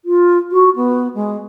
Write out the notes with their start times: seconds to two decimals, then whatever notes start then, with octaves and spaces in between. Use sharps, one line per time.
0.05 F4
0.52 F#4
0.76 B3
1.15 G#3